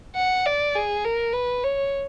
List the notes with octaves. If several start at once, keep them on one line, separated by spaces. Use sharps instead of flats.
F#5
D5
G#4
A#4
B4
C#5